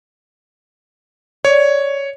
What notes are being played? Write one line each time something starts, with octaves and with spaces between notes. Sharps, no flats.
C#5 D5